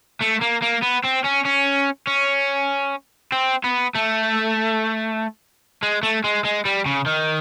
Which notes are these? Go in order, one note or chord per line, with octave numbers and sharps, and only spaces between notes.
A3
A#3
A#3
B3
C4
C#4
C#4
C#4
C4
B3
A3
G#3
A3
G#3
G#3
G3
C#3
D#3